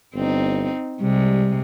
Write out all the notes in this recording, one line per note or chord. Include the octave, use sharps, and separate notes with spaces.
G1 C4 D#4
C3 G3 G#3